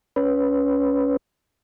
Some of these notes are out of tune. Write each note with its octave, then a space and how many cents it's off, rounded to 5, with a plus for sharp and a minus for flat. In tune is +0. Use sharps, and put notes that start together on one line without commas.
C#4 +15 B4 +0